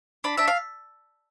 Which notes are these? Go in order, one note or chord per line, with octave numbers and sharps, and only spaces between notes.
D4 B5
D4 E5
F5